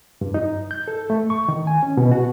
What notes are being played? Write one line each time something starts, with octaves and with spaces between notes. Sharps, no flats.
G2
D#4
G6
A4
A3
C#6
D#3
G#5
C#4
B2
F#4